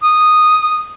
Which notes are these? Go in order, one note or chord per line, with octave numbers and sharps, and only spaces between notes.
D#6